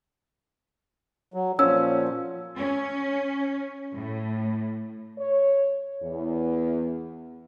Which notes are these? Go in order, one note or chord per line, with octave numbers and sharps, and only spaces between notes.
F#3
A#2 F3 C#4 E6
C#4
A2
C#5
E2